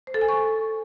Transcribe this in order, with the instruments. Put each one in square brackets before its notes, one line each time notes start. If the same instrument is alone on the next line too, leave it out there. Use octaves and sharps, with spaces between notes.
[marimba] C5
A4
G#5
C#6